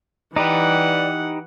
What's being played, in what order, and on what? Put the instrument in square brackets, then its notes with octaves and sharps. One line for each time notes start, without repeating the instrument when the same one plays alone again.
[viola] E3 F#5 [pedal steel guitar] D#4 G4 B4 [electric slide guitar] D5 G5